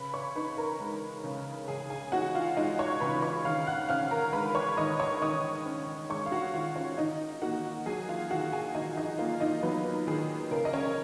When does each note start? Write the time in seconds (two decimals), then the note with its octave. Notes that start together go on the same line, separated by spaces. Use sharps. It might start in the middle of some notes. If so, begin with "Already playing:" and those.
Already playing: C#3 B4 B5
0.14 C#5 C#6
0.36 D#4 B4 B5
0.57 A#4 A#5
0.80 G#3
1.24 C#3
1.68 C#3 G#4 G#5
1.90 G#4 G#5
2.12 D#4 F#4 F#5
2.35 F4 F5
2.57 G#3 D#4 D#5
2.79 C#5 C#6
3.00 C#3 B4 B5
3.22 C#5 C#6
3.45 D#3 F5 F6
3.67 F#5 F#6
3.89 C#4 F5 F6
4.11 A#4 A#5
4.33 G#3 B4 B5
4.55 C#5 C#6
4.77 D#3 D#5 D#6
4.99 C#5 C#6
5.22 D#3 D#5 D#6
5.66 C#4
6.10 G#3 C#5 C#6
6.26 F5
6.32 F#4 F#5
6.54 D#3 F4 F5
6.76 C#4 C#5
6.98 D#3 D#4 D#5
7.42 A#3 F#4 F#5
7.86 F#3 G#4 G#5
8.09 F4 F5
8.31 D#3 F#4 F#5
8.52 G#4 G#5
8.75 D#3 D#4 D#5
8.96 D#4 D#5
9.18 A#3 F4 F5
9.40 D#4 D#5
9.63 F#3 B3 B4
10.07 D#3 G#4
10.51 C#3 A#4
10.65 D#5
10.73 C#4 C#5